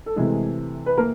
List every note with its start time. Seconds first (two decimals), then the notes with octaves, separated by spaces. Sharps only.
0.06 A4
0.16 C3 E3 G#3 A3 G#4
0.86 B4
0.98 A#3 A#4